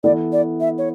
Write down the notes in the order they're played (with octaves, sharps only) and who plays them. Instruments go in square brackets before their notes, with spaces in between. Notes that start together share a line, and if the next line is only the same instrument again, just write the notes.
[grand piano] E3 B3 E4 A4 [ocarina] D5
[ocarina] D5
E5
C#5